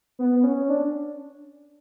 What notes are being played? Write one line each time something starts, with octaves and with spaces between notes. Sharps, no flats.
B3
C#4
D4